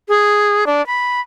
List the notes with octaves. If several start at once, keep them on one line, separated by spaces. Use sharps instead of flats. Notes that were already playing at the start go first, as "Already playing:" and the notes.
G#4
D4
B5